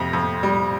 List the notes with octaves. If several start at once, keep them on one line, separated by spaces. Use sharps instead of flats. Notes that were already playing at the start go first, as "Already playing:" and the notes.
Already playing: F2 C3
F2
G3